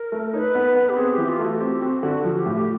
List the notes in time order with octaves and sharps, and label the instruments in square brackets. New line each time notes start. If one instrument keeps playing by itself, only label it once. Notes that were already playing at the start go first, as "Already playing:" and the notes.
Already playing: [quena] A#4
[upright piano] A3
[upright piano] D#4 [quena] C#5
[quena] B4
[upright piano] B3
B3
[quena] G4
[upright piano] C4 [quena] G#4
[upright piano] E3 [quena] G4
[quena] F4
[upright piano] A3
[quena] F#4
[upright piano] C4 [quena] G4
[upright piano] C4 [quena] F#4
[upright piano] D3 [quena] F#4
[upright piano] F3 [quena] F#4
[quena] G4
[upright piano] A2
[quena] G4